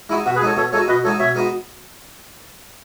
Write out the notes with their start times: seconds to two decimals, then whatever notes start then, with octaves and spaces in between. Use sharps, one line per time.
0.09 G#3 D#4 E4 F#4
0.25 B2 F#4
0.36 G#4 B4
0.41 G#3 D#4 F#4 A4 C#5
0.57 B2 A4 C#5
0.72 G#3 D#4 F#4 A4 C#5
0.88 B2 B4 D#5
1.04 G#3 D#4 F#4 A4 C#5
1.19 B2 C#5 E5
1.35 G#3 B3 D#4 F#4